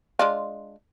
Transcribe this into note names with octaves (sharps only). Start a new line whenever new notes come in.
G#3 D4 F4